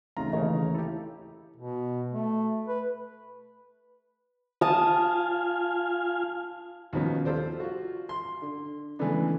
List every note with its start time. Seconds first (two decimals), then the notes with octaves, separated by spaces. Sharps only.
0.17 C#3 E3 A3 C4 D#4 F4 A#5
0.33 D#2 C#3 E3 A3 C#5
0.75 E4 G4 A4
1.56 B2
2.12 A3
2.68 B4
4.61 F4 F5 G#5 A5 D#6
6.93 D#2 B2 D#3 F3 B3 C#4
7.25 F4 G4 A4 C5 D5
7.60 F4 F#4
8.09 C6
8.42 D3
8.99 C#3 E3 G#3 A3 B3 D4